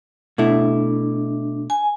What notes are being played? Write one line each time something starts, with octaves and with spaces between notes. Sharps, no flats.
B2 A3 D4 E4
G#5